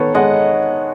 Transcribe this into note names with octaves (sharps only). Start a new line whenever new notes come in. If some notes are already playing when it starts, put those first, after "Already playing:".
Already playing: D#3 B3 A4 C#5
G#3 D#5 F#5